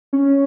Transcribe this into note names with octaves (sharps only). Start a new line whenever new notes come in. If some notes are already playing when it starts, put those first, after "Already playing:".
C#4